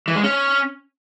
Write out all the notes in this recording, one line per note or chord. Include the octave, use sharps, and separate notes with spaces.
E3
G#3
C#4